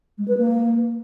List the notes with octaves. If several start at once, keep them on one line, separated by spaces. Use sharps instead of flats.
G#3
B4
A#3